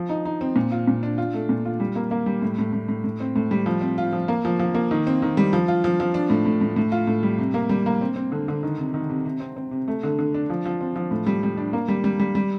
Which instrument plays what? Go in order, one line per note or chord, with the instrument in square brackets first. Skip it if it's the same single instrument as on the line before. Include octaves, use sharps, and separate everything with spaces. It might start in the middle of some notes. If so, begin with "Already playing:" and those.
Already playing: [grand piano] F3
D#4
D#4
C4
A#2
F4
A#2
D4
F4
A3
A#2
F4
G3
A#3
A#3
G3
A2
A2
A2
A2
A2
C4
A2
G3
F3
C4
F4
F3
A#3
F3
F3
A#3
D#3
C4
D#3
G3
F3
F4
F3
F3
D4
A2
A2
A2
A2
F4
A2
G3
C3
A#3
G3
A#3
C4
C4
D3
D3
D#3
C3
D#3
C3
C3
C4
C4
C3
A3
D3
D3
D4
F3
F3
C4
F3
A2
G3
G3
D4
A#3
G3
G3
G3
G3